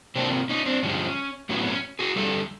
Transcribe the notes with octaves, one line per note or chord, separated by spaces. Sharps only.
C3 F3 A#3 C4 D4
C#4 D#4
C4 D4
G2 D3 F3 G#3 C#4
A2 F#3 B3 C#4
C#4
F#4 G#4
F2 D3 G3 A4